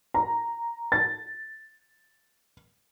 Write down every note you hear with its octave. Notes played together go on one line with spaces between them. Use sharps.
A#5
A6